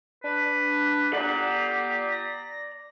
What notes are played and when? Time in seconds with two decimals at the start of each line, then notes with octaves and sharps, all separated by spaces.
0.24 D4 B4
1.13 G4 D5 F#5 A#5
2.12 A#6